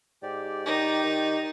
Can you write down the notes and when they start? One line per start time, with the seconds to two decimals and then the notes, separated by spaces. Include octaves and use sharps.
0.23 G#2 G4 D5
0.66 D#3 D#4
1.04 D#3